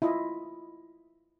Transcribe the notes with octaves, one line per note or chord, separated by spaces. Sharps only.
E4 F4 D#5